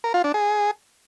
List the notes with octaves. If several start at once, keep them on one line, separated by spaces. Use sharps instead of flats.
A#4
F4
D4
G#4